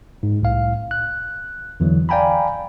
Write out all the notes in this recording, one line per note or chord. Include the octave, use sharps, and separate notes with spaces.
G#2
C2 A2 F5
F#6
E2 D3 E3 F#3
D5 F5 G5 G#5 A#5 B5